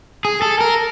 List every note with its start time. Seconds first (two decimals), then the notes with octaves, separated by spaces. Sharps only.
0.25 G#4
0.42 A4
0.61 A#4